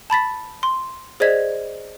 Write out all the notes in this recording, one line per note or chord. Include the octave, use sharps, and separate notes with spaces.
A5 B5 A6 B6
C6
G#4 C5 D5 D#5 G#6 B6